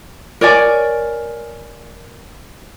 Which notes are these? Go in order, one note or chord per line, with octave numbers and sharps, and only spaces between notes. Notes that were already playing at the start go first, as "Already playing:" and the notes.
A#4 C#5 D5 G#5